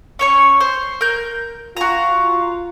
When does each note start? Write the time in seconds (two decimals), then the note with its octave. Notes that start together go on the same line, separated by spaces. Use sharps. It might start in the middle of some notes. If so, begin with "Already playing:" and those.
0.19 C#4 C#5 C#6
0.60 C5
1.01 A#4 G6
1.77 F4 F#4 A#5